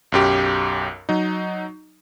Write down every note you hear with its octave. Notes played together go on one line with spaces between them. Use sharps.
B1 F#2 G4
F#3 D#4